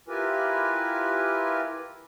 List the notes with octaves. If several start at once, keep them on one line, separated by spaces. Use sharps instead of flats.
E4 F4 G4 A#4 B4 G#5